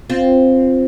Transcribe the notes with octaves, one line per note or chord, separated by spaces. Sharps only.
C4 F4